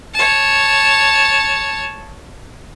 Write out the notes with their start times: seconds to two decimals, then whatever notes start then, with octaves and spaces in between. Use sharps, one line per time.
0.14 C#5 A5